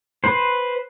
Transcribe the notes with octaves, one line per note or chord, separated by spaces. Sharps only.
B4 C5